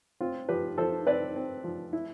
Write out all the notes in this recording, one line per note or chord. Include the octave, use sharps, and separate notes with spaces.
C4 F4
F3 G4 B4
F3 A4 C5
C4 B4 D5
C4
F3
E4